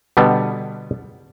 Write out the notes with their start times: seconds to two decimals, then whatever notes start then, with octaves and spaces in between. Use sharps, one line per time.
0.17 B2 D3 G3 B3